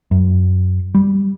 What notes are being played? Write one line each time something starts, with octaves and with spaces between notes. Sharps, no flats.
F#2
G3